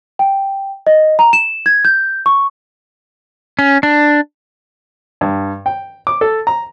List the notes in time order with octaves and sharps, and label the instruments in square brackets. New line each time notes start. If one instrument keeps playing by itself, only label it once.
[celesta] G5
D#5
A#5
E7
G#6
G6
C#6
[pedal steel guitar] C#4
D4
[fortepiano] G2
G5
D6
A4
A#5